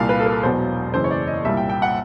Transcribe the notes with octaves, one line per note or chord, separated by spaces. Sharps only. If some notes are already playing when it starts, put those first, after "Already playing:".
Already playing: C2 A#2 G3 F5
B4
A4
A#4
E1 E2 B2 F#3 C5
F#1 F#2 C#3 E3 C5
C#5
D5
D#5
C2 A#2 G3 E5
G5
G5
F#5